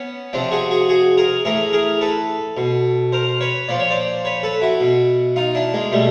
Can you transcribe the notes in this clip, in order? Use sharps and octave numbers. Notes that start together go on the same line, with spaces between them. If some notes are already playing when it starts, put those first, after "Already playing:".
Already playing: B3 C#4
C3 F3 C4 D4
F#4 G#4
F#4 G#4
F#4 G#4
G#4 A#4
A2 E3 G#4 A#4
G#4 A#4
A4 B4
B2
A#4 C5
B4 C#5
A#2 F3 D5
C#5
C5 D5
B4 C#5
A4 B4
E4 F#4
B2
D#4 F4
D4 E4
G#3 A#3
B2 G3 A3